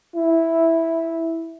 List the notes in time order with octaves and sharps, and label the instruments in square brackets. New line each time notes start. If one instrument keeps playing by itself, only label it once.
[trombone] E4